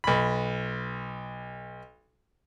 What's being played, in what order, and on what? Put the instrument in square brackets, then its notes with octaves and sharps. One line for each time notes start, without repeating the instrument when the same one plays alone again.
[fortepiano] B1 B5